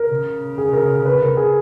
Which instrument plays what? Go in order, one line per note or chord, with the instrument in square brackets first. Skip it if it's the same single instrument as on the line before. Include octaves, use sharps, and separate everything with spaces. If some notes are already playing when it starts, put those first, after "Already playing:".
Already playing: [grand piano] A#4
[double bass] C#3
[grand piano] G#4
A#4
B4
A#4
G#4